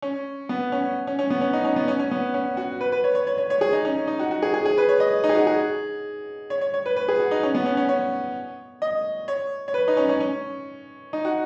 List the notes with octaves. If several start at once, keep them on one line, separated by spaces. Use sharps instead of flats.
C#4
B3
C#4
C#4
C#4
B3
C#4
D#4
C#4
B3
C#4
C#4
B3
C#4
F#4
B4
B4
C#5
C#5
C#5
C#5
C#5
G#4
D#4
C#4
D#4
F#4
F#4
G#4
G#4
G#4
B4
C#5
D#5
D#4
G#4
F#4
G#4
C#5
C#5
C#5
B4
B4
G#4
F#4
D#4
C#4
B3
C#4
C#4
C#5
D#5
C#5
C#5
B4
D#4
C#4
C#4
C#4
D#4
F#4